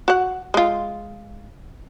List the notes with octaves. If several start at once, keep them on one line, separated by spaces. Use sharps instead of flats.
F#4 F#5
G#3 F4